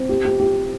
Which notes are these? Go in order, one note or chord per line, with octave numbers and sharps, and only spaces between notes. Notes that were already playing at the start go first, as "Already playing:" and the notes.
Already playing: C4
G4
G4
G4